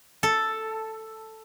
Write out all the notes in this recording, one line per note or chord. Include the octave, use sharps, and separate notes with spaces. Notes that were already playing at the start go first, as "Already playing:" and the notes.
A4